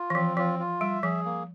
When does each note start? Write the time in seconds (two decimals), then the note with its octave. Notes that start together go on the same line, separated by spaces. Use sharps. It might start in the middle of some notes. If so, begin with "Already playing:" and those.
Already playing: F4
0.10 E3
0.15 F3 C4
0.37 F3 F4
0.59 F4
0.81 G3 E5
1.03 F3 G#4
1.25 A#3